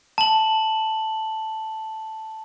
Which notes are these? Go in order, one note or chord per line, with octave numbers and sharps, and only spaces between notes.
A5 F#7